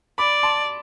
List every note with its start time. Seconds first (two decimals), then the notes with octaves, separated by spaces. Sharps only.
0.18 D5 B5 D6
0.43 A5 C6